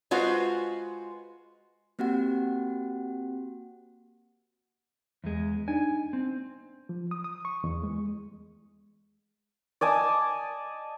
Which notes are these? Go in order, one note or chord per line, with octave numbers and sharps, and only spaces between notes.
G#3 F4 F#4 B4 C5
A#3 C4 F#4 G4 F#5
E2 G#3
D4 D#4 G#5
C4
F3
D#6
D#6
C#6
E2
G#3
D5 D#5 G#5 A5